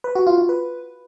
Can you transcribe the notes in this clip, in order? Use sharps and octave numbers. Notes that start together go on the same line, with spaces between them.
B4
F#4
F4
F4
B4